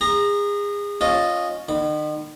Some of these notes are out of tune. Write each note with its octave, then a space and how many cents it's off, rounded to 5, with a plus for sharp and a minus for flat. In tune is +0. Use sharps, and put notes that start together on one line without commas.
G#4 -30 A#5 +0
C#4 +0 F4 +15 D#5 -10
D#3 -40 B5 +0